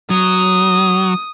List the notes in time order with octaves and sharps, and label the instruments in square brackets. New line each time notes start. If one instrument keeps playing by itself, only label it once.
[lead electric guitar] F#3 [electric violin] D#6